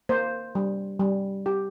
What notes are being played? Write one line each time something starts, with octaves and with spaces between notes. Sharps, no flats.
A#3 C5
G3
G3
G4